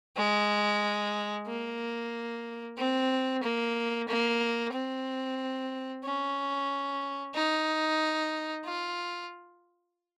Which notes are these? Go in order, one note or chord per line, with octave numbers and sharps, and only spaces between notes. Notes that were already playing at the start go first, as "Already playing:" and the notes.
G#3
A#3
C4
A#3
A#3
C4
C#4
D#4
F4